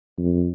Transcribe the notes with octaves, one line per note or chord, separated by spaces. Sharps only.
F2